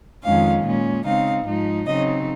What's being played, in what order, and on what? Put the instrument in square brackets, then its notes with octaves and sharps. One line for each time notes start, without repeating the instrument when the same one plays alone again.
[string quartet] F2 D#3 G#3 C#4 F5
A#2 G#3 C#4
C#3 G#3 C4 D#4 F5
G#2 F3 G#3 D#4
C#3 F#3 C4 D#4 D#5